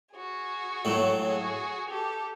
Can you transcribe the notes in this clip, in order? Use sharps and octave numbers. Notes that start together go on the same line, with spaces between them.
F#4 G#4
A2 F#3 A3
F#4 G#4
G4 A4